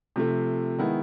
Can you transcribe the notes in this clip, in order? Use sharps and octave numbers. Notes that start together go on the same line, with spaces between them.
C3 F3 A3
D#3 G#3 B3 E4